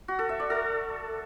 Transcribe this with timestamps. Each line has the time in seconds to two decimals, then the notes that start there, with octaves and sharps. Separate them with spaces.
0.08 F#4
0.19 A4
0.29 E5
0.40 D5
0.50 A4